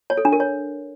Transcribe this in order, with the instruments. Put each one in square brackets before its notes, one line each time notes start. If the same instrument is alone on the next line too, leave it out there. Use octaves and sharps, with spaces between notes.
[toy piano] C#5
A4
D4
A#4
C#5